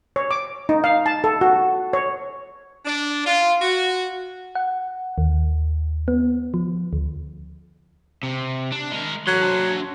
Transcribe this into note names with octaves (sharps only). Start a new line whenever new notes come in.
C#5
D6
D#4
F5
A5
A4
F#4
C#5
D4
F4
F#4
F#5
D#2
B3
F3
D2
C3
D4
G#3 A#4
F#3 A4 C6
D4 C5